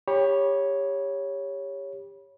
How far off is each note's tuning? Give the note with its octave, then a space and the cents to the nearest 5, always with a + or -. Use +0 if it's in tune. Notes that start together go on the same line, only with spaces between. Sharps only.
G4 +25 C#5 +0 B5 -25